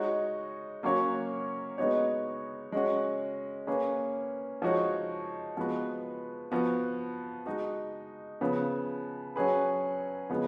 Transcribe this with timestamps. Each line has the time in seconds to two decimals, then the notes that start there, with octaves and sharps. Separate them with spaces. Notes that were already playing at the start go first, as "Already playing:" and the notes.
Already playing: G#3 D#4 F#4 C#5
0.83 F#3 A#3 C#4 F#4 C#5
1.78 G#3 B3 D#4 F#4 C#5
2.72 G#3 C#4 F#4
3.67 A#3 C#4 G#4 B4
4.62 F3 G#3 D#4 F#4 C#5
5.57 F3 G#3 B3 F#4 B4
6.51 F3 B3 F#4
7.46 G#3 D#4 F#4
8.41 C#3 F3 B3
9.36 F#3 C#4 G#4 B4
10.30 C#3 F3 G#3 B3